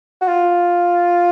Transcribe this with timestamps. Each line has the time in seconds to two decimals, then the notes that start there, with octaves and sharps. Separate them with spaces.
0.21 F#4
0.28 F4